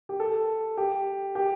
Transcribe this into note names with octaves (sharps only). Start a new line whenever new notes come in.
G4
A4
G4
G4